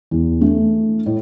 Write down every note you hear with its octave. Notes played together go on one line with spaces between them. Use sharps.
E2
A3
A2